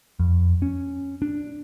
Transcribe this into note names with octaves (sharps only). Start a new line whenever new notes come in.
F2
C#4
D4